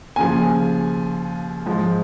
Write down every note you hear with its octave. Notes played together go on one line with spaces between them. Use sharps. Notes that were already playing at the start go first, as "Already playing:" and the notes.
D#2 C#3 F3 G#5
G#2 F3